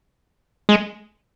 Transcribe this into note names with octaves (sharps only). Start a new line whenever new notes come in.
G#3